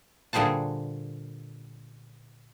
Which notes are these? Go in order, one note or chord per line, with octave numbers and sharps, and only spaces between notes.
A#2 D3 G3 G#4 C5 A5